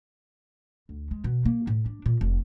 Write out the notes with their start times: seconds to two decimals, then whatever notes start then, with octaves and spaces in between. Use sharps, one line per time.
0.89 D2
1.11 G#3
1.24 B2
1.45 A#3
1.67 A2
1.86 D4
2.06 A#2
2.21 F1